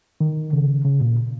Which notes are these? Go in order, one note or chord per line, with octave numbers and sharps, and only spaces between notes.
D#3
C#3
C#3
A#2